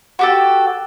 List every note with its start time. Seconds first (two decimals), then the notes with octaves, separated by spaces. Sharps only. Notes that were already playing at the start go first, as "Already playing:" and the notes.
0.19 F#4 G4 A4